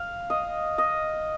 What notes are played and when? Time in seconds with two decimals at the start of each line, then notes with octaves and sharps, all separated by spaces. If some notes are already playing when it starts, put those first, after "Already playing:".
Already playing: F5
0.30 D#5
0.78 D#5